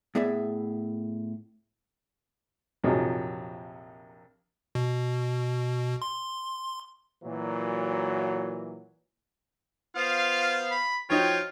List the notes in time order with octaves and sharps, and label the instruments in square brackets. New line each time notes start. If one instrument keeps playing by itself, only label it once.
[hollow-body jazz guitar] A2 B3 G#4 D5 E5
[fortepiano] A#1 F2 C3 F#3 D#4 G#4
[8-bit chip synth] B2
C6
[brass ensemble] A#2 E3 F#3
[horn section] B3 C5 F5 [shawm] F4
[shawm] B5
[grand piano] F3 D#4 F#4 [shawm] F4 [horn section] C#5 G5